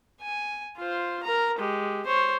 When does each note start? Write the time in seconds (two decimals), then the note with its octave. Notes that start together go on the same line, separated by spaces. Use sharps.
0.21 G#5
0.77 F4 C5
1.23 A#4 A#5
1.58 G#3 G4
2.06 C5 C#5